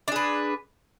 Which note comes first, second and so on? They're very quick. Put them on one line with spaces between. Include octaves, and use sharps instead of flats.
D4 G#4 B4